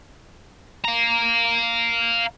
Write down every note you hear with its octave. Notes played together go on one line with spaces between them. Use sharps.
F5 A#5